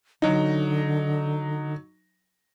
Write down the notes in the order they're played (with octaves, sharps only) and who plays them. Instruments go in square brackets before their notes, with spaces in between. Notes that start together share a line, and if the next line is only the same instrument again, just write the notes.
[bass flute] D3 [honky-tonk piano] F#3 D#4